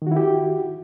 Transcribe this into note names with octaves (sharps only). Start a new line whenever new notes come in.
D#3 E4 F#4 G4